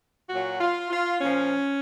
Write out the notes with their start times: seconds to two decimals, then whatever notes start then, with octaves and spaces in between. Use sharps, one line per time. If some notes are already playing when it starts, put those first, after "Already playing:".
0.30 A#2 F#3 F#4
0.61 F4
0.91 F4
1.21 A#2 F3 C#4